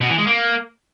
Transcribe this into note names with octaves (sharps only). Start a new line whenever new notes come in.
B2
E3
G#3
A#3